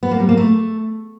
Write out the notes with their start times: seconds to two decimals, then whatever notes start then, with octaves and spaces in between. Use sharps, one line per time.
0.03 B3
0.11 A#3
0.20 G3
0.29 A#3
0.37 A3